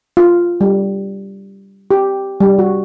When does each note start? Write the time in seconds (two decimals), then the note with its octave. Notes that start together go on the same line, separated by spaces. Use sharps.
0.17 F4
0.61 G3
1.91 G4
2.40 G3
2.59 F#4